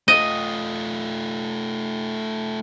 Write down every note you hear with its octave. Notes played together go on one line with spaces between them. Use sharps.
A3 F4 D#5